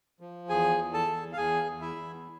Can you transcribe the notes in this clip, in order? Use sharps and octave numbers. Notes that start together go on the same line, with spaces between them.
F3
E2 G#4 G#5
E2
A4 A5
E2
F5
E2 G#4 G#5
E2
E4 E5
E2